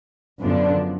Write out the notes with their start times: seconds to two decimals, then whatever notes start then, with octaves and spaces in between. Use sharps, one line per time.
0.40 F#2 D3 F3 B3 D4